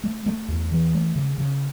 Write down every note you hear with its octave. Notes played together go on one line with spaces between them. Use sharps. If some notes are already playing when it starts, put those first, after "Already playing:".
A3
A3
E2
E3
A3
C#3
C#3